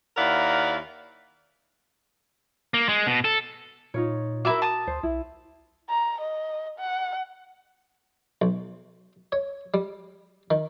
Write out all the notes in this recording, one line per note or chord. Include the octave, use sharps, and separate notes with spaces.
D#2 E4 A#4 D5 F5 F#5
A#3
G#3
B2
A4
A#2 D#4 F4 C#5
E4 F#4 A#4 E5 D6
A5 D#6
D2 C5
B1 E4
A#5
D#5
F#5
B1
C#5
G3
D#3